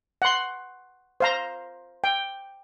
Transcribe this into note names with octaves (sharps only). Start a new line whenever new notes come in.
F#5 C6
C5 F5 A#5
G5